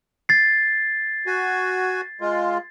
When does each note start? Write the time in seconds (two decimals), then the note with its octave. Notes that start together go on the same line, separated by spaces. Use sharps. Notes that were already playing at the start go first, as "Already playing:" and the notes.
0.29 G#6 A6 C7
1.27 F#4 G#5
2.21 G#3 F4